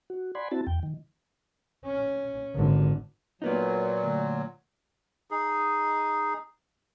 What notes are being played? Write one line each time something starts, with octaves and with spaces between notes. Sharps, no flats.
F#4
D5 F#5 G#5 B5 C6
C4 E4 F#4 A5
E2 G5
D#3
C#4
G#1 D3
A#2 F#3 A#3 B3 D#4
D2
D#4 G#4